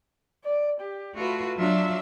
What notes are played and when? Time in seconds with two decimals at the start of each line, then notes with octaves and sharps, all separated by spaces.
0.44 D5
0.81 G4
1.17 A3 F4 F#4 B4
1.57 F#3 D4 F4 E5